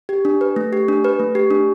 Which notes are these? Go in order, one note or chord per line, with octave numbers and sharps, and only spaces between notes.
G4
D4
B4
A3
G4
D4
B4
A3
G4
D4